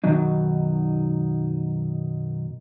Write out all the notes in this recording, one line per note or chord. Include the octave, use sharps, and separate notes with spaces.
F#2 B2 D#3 F#3 D#4